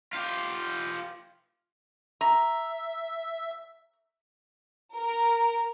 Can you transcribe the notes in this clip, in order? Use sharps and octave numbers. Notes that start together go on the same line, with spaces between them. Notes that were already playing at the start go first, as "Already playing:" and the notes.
F4 G4
E5 A#5
A#4